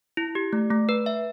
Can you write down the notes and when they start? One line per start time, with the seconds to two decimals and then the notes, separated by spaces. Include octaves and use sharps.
0.17 E4
0.35 G4
0.53 A3
0.71 A3
0.89 B4
1.06 E5